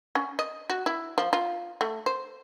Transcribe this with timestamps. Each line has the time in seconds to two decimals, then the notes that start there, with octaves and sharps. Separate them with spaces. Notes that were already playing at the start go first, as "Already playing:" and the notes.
0.15 C#4
0.39 D#5
0.70 F#4
0.86 E4
1.18 F3
1.33 F4
1.81 A3
2.06 C5